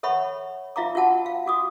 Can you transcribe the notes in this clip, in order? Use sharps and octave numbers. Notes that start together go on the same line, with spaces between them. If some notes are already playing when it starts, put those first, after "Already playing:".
A4 C#5 E5 F#5 B5 C#6
F4 E5 F5 A#5 D6
F4 F#4 F#5 A5
F5
F#4 D6 D#6